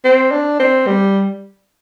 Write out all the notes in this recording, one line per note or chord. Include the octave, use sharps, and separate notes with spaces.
C4
D4
C4
G3